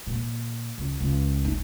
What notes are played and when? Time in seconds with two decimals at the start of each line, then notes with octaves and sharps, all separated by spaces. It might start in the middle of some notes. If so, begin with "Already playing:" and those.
0.07 A#2
0.78 C#2
1.00 C#2
1.44 G1 D#4